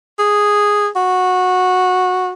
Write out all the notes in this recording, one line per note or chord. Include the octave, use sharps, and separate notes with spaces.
G#4
F#4